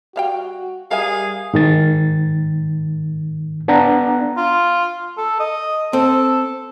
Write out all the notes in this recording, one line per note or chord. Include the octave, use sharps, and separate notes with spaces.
G3 F#4 F5 G5
G3 G#4 A#4 E5 F5 G#5
G#2 D#3 A6
B3 D4 D5 F#5 A#5
F4
A4
D#5
C4 A4